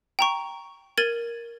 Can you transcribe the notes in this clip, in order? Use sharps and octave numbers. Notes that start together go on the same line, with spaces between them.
G5 A#5 C#6
A#4 G#6 A6 D#7 F#7